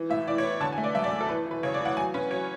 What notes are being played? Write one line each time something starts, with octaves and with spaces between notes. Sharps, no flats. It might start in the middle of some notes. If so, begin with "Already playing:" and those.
Already playing: E3
A2 E5
E3 D5
C#5
B3
D3 A5
G#5
A3
D5
F#2 E5
D5
A3
A4
E3 B4
E3 B4
C#3 C#5
D5
E3
F#5
F#3 G#5
C#4 B4
F#3 C#5